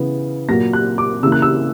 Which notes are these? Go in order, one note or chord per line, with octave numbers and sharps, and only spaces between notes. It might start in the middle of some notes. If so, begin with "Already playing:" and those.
Already playing: C#3 E3 B3
A#2 F#3 A#3 A#6
F#6
D6
C#3 E3 A#3 E6
F#6
E6